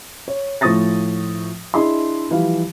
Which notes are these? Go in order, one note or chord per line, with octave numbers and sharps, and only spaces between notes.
C#5
A2 F3 C#6 D#6 A6 A#6
D4 E4 G#4 D#5 C6
E3 F3 G3 F5